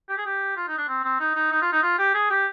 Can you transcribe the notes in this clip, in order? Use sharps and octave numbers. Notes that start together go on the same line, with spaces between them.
G4
G#4
G4
F4
D#4
D4
C4
C4
D#4
D#4
D#4
F4
D#4
F4
G4
G#4
G4